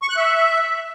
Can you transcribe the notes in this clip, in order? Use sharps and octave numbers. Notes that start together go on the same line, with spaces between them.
C#6
F#6
E5